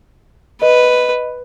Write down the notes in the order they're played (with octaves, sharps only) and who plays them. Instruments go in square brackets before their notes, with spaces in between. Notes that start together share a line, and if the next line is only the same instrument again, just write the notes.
[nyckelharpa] B4 [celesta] D#5